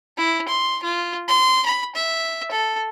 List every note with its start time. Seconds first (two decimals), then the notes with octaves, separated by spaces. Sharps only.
0.17 E4
0.48 C6
0.83 F4
1.28 C6
1.66 B5
1.95 E5
2.51 A4